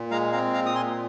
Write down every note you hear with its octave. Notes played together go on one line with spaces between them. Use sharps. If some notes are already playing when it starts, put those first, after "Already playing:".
Already playing: A#2
G#3 F5 A#5
C4 F5 A#5
A#2 F5 A#5
D#6
A#2 G#5 C6